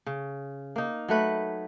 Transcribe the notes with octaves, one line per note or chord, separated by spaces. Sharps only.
C#3
A#3 D#4
F#3 A3 B4